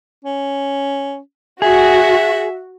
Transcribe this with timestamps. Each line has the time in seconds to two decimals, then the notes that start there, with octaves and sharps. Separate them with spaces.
0.24 C#4
1.62 F#4 G#4 E5